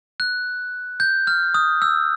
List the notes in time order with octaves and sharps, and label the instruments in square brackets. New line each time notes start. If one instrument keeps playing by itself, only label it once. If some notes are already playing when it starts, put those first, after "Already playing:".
[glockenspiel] F#6
G6
F6
D#6
E6